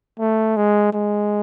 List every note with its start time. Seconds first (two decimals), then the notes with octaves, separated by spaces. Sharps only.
0.19 A3
0.57 G#3
0.93 G#3